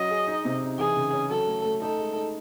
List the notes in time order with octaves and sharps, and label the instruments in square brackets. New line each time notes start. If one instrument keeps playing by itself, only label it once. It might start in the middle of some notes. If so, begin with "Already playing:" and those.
Already playing: [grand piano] F#3 C#4 [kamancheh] D#5
[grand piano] G#4
D#4
C3
D#4
[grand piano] E3 [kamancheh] G#4
[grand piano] C#3
C#4
[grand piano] F#3 [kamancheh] A4
[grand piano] A3
A3
[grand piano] D#4 [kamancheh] A4
[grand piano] G#3
D#4